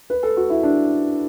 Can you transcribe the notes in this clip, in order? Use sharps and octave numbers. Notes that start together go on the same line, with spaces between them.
B4
A4
F#4
E4
D4